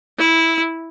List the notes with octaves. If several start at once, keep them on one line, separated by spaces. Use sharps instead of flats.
E4